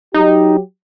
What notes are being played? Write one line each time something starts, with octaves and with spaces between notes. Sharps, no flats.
F#3 D#4 G4